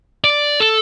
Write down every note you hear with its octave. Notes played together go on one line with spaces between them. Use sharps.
D5
A4